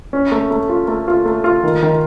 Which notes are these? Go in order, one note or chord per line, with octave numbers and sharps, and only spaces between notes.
C#4
A3
A3
F4
A3
F4
A3
F4
D#3
D#3